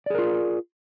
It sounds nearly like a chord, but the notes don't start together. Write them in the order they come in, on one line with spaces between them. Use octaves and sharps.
D5 G#4 A#4 F4